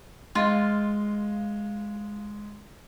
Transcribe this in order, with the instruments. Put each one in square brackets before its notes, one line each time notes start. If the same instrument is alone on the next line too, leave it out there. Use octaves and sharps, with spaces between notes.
[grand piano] G#3 [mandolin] F4